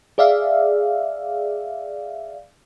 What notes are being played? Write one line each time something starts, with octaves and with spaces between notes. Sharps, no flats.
G#4 D5 E5 F5